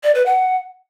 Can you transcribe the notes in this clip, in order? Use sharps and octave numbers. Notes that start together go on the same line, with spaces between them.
D5
B4
F#5